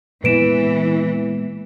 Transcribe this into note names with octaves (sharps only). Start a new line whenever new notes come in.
A#2 E3 G#3 B3 B4 D7 E7